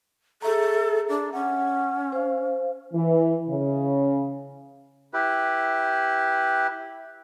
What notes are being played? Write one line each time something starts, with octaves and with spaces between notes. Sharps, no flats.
G#4 A4 E5 A#5
D4
C#4 F#5
C5 F5
E3
C#3
E4 G4 B4